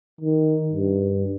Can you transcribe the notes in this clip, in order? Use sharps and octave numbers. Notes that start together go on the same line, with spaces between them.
D#3
G2